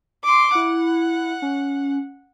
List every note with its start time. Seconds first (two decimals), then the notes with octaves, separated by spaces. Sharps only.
0.24 C6 D6
0.55 E4 F#5
1.42 C#4